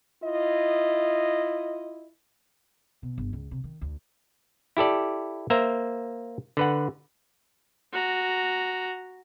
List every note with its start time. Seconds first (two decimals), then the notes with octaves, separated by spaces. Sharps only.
0.22 E4 F4 D#5
3.03 B2
3.18 G1
3.33 C#2
3.51 C3
3.64 D#3
3.81 D2
4.77 E4 G4 A4 D5
5.50 A#3 C5 E5 A#5
6.57 D3 B4 F#5
7.92 F#4 A#5